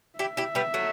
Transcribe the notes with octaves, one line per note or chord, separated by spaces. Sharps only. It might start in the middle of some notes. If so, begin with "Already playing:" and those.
E4 G4 E5
E4 G4
G3 B3
F#3 A3